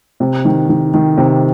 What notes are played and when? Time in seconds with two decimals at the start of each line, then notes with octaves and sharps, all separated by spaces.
0.20 C3
0.45 D#3
0.69 D#3
0.94 D#3
1.17 C3